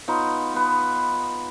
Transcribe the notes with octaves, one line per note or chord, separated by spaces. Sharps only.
B3 D#4 F4
B3 B4